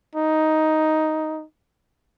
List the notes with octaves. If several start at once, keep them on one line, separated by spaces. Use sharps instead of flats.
D#4